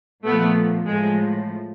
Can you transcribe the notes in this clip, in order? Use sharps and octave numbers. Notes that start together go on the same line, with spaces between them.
A#2 F3 A3 B3
A2 F3 G#3